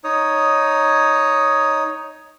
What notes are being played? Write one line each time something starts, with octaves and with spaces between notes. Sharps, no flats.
D#4 C#5 D#6